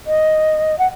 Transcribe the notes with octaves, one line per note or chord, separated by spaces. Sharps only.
D#5
F#5